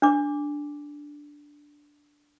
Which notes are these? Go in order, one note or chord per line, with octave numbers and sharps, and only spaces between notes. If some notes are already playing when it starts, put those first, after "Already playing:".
D4 D6